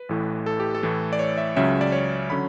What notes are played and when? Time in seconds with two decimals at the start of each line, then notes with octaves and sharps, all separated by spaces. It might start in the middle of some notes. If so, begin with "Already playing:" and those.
Already playing: B4
0.09 A1 A2 E3 A3
0.46 A4
0.60 G4
0.75 A4
0.83 A2 E3 A3
1.13 D5
1.19 C#5
1.38 E5
1.56 C#2 C#3 F#3 C#4 E5
1.81 D5
1.92 C#5
2.30 D3 F#3 C#4 B5